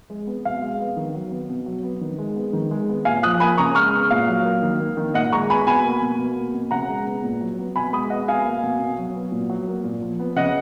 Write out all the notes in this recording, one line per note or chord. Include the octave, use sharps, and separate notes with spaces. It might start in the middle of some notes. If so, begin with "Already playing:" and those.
G#3
B3
B2 F5
G#3
B3
D#3
F#3
B3
B2
F#3
B3
D#3
G#3
B3
D#3
G#3
B3
A#2 F5 G#5
F3 D#6 F#6
A#3 G#5 B5
C#3 A#5 C#6
G#3 C#6 F6
B3
A#2 F5
F#3
A#3
D#3
A#3
D#3
A#2 D#5 F#5
G#3 A#5 C#6
B3 G#5 B5
B2 G#5 B5
A#3
B2
B2
A#3
B2
C#3 F#5 A#5
G#3
B3
A#2
F#3
B3
B2 G#5 B5
G#3 B5 D#6
B3 D#5 F#5
B2 F5 G#5
A#3
B2
B2
F#3
B3
A#2
F#3
A#3
A#2
F3
B3
C#3 D#5 F#5